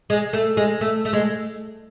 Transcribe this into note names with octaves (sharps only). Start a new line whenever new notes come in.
G#3
A3
G#3
A3
A3
G#3